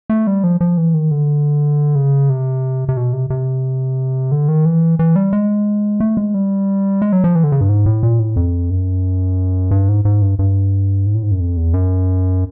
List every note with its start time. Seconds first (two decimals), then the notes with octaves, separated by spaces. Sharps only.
0.10 A3
0.27 G3
0.44 F3
0.61 F3
0.77 E3
0.94 D#3
1.11 D3
1.95 C#3
2.30 C3
2.89 C3
2.97 B2
3.13 C3
3.30 C3
4.32 D3
4.48 D#3
4.65 E3
4.99 E3
5.16 G3
5.33 G#3
6.00 A3
6.17 G#3
6.34 G3
7.02 G#3
7.12 F#3
7.24 F3
7.35 E3
7.44 D3
7.52 C#3
7.61 G2
7.69 G#2
7.86 A2
8.03 A#2
8.19 A2
8.36 F2
8.70 F#2
9.71 G2
9.89 G#2
10.05 G#2
10.22 G2
10.39 G2
11.06 G#2
11.15 A2
11.23 G#2
11.31 F#2
11.40 F2
11.57 E2
11.74 F#2